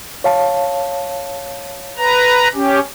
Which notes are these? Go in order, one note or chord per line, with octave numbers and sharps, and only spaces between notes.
C#5 F5 A5
B4 A#5
C#4 G4